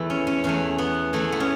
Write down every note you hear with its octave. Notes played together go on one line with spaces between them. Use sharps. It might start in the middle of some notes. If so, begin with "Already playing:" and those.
Already playing: E2 E3 A3 E4
C#4
C#4
E2 E3 A3 C#4
B3
E2 E3 A3 E4
B3
C#4